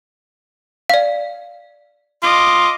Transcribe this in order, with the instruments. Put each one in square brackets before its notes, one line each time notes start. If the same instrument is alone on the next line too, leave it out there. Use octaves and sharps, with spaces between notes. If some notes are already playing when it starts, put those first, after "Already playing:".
[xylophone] D5 F5
[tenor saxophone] F4 [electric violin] D#5 D6